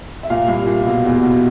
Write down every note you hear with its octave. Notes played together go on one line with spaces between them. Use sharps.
E5
A#2 F5
C2
A#2
B2
E2
B2